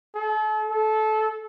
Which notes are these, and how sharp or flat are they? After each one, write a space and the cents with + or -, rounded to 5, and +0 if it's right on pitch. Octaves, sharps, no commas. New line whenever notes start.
A4 -40
A4 -20